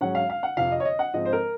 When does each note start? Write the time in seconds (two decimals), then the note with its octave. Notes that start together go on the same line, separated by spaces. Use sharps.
0.01 G#2 F#3 C#4 F#5
0.15 F5
0.30 F5
0.43 F#5
0.57 F2 C3 F3 F5
0.72 D#5
0.80 C#5
0.85 D#5
0.99 F#5
1.14 G#2 F3 C4 D#5
1.25 C5
1.33 A#4